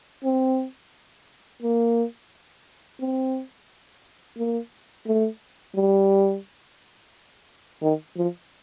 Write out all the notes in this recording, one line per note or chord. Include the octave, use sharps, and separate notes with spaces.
C4
A#3
C4
A#3
A3
G3
D#3
F3